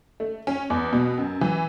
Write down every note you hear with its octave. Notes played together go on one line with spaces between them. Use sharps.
A3
C#4
E2
B2
F#2
E3